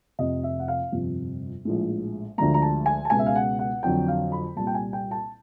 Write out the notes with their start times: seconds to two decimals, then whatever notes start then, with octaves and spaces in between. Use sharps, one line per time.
0.19 F1 F2 C3 D#5
0.44 E5
0.60 F#5
0.68 F5
0.92 G1 F2 C3 F3
1.65 A#1 A2 F3 G#3
2.38 D2 D3 F3 G#3 A#5
2.54 A#5
2.62 A5
2.86 G#5
3.05 A5
3.10 C#2 B2 G#3 G#5
3.19 E5
3.26 F5
3.36 F#5
3.59 F#5
3.83 F2 D3 F#3 G5
4.08 F5
4.32 B5
4.56 C2 A#2 G3 A5
4.67 G5
4.74 G#5
4.93 G5
5.11 A5